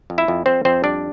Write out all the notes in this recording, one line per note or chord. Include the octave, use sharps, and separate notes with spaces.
F2
E4 E5
F2
F2 C4 C5
F2 C4 C5
G3 D4 D5